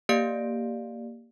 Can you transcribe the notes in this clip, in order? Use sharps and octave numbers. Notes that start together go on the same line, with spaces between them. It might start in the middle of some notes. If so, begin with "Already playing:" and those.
A#3 G4 D5 F5 D7